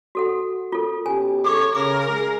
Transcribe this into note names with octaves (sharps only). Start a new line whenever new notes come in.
F#4 A4 F#5
F4 A4 A#4
B2 C#4 G4 G#5
C#3 G#4 A4 C#5 D6
C#3 A#4 D6
G#3 G#4